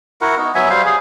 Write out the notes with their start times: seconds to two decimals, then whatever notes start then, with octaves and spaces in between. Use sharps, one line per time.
0.21 E4 F#4 A#4 F#5
0.37 B3 D#4
0.55 F#3 B3 E5 G#5
0.70 G3 C5 F5
0.85 G#4